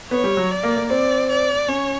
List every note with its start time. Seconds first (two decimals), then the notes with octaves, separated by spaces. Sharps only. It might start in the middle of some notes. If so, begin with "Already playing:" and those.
0.11 B3 C#5
0.24 G3
0.37 F#3
0.51 D5
0.63 A#3
0.77 A#3
0.89 C4 D5
1.29 D5
1.68 C#4 C#5